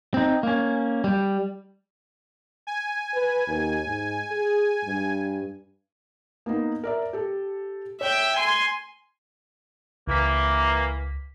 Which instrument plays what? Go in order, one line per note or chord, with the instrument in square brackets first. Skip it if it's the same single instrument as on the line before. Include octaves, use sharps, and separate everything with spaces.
[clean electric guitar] C4 D#4
A#3 C#4
G3
[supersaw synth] G#5
[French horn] B4
D#2
G#2
G#4
G2
[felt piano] A#3 B3 D#4
A#4 D5 E5
G4 A4
[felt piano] C#5 [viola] E5 G5
[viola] G#5 C6
[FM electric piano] C#2 B6 [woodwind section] E3 A#3